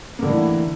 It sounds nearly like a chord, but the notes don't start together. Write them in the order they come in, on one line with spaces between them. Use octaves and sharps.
A#3 D3 A2 E3